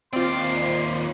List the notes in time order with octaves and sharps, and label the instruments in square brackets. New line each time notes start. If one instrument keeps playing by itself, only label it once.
[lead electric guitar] D#2 D5 [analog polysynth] C4 F4 [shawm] C6